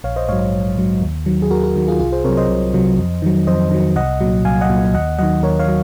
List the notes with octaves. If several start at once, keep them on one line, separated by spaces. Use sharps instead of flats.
A#1 C#5 F5
C5 D#5
G#2 F#3 C#5 F5
A#1
G#2 F#3
D#2
D#3 F#3
G#4
D#2 F#4 A#4
F#4 A#4
D#3 F#3
F4 G#4
C2 F4 G#4
G#4 C5
C3 F#3 A#4 C#5
C5 D#5
C2
C3 F#3
F2
D#3 F#3
F2 C5 D#5
D#3 F#3
C2 D#5 F#5
A#2 F#3
C2 F5 G#5
D#5 F#5
A#2 F#3
D#2 D#5 F#5
D#3 F#3 D#5 F#5
D#2 A#4 C#5
C#5 F5
F#3